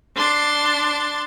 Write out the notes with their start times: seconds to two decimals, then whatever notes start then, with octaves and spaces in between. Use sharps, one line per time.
0.16 D4 C6 A6